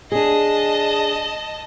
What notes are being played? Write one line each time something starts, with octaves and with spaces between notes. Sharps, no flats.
D4 G#4 D#5 A5